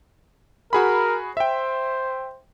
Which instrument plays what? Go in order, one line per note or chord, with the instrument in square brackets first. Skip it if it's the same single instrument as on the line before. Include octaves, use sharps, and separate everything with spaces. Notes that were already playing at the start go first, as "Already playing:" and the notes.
[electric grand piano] F#4 G#4 B5 [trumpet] A#4
[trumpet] C5 [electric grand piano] E5 G5